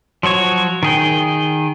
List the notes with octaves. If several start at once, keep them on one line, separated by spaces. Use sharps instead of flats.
F3 F#3 F#4 C#5
D#3 G#4 G5